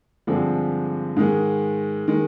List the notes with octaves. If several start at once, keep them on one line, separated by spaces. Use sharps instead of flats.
G2 D3 F3 G#3 C4
G#2 D#3 G#3
D#3 G#3